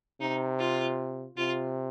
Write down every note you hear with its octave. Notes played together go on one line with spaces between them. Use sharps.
C3 D#4
F4
C3 F4